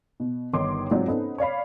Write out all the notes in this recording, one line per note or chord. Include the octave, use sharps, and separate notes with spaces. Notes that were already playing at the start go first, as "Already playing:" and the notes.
B2
G1 D#3 D#4 C#5 C6 D6
G#2 F#3 C4 F4 D5
B3 C#4 D#4 A4 C5
C#5 D5 F5 B5